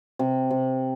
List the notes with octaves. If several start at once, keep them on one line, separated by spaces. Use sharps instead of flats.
C3
C3